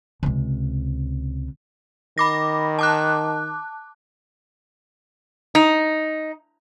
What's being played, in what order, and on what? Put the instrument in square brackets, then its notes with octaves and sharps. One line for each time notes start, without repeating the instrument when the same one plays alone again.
[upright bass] C#2 C3
[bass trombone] D#3 [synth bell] B5 D6 A#6
[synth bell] A5 D6 F#6
[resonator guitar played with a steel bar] D#4